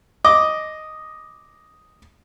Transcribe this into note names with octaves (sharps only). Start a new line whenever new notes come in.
D#5 D6